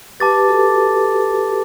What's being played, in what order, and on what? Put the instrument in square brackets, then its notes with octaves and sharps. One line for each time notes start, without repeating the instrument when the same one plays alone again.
[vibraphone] G4 B4 [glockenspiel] A5 D6 A6
[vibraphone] F#4 A4